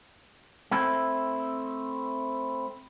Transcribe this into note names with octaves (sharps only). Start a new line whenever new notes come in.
A3 C4 E4